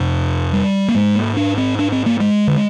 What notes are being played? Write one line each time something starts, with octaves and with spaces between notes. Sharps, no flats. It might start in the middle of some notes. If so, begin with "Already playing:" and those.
Already playing: F2 C3
G3
A#3
G#2 G#3
A#3
D4
C4
D4
C4
A#3
G#3
D3